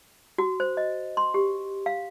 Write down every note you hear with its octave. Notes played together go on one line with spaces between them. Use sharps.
F#4
C5
D#5
C6
G4
F5